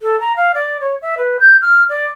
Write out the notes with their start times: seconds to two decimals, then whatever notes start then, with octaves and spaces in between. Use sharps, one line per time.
0.02 A4
0.20 A#5
0.36 F5
0.54 D5
0.81 C#5
1.02 E5
1.18 B4
1.40 G6
1.62 F6
1.89 D5